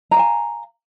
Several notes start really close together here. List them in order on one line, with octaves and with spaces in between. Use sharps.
A#5 G5 F5 G#5